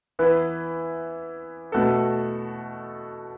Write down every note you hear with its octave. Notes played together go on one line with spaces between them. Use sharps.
E3 B3 E4 B4
B2 A3 F#4 A4